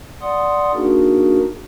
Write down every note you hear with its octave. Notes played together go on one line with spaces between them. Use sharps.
D5 F#5 C6 D#6
A#3 D4 D#4 F#4 G#4 A#4